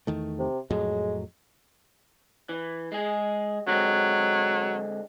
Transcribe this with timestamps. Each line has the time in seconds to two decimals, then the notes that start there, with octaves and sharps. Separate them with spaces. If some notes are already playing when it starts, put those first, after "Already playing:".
0.07 E2 D#3 A3
0.39 C3
0.70 F2 A2 F#3 G#3
2.49 E3
2.92 G#3 G#4
3.67 D3 F#3 G#3 C4